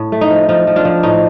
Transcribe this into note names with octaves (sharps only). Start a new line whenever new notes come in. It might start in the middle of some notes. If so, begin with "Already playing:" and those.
Already playing: A2
A3
D#4
F3
F3 D#4
F3
D4 F4
F3
A2 D#4